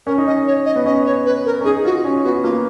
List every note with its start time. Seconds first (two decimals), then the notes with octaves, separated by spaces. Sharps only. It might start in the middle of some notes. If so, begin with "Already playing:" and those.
0.06 C#4 A#4
0.18 D#4
0.27 C#4 D#5
0.47 C#5
0.66 D#5
0.76 B3
0.85 C#4 D#5
1.06 C#5
1.26 B4
1.46 A#4
1.61 C#4
1.64 D#4 G#4
1.85 F4 F#4
2.04 C#4
2.24 B3 F#4
2.44 A#3 F4